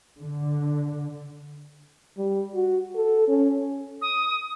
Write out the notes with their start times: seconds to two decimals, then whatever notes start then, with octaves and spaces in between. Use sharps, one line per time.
0.17 D3
2.17 G3
2.55 F#4
2.95 A4
3.28 C#4
4.02 D#6